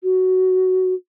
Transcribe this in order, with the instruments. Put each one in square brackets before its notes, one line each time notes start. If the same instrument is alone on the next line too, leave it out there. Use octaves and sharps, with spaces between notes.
[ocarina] F#4